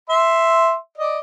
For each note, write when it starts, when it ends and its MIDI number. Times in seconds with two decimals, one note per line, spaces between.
0.09 0.75 76
0.09 0.75 84
0.98 1.19 74
0.98 1.19 75